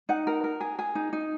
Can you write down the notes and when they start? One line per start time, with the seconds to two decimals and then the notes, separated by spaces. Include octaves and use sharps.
0.09 D#4 F#5
0.27 A#4
0.44 A#4
0.61 G#4
0.79 G#4
0.95 D#4
1.13 D#4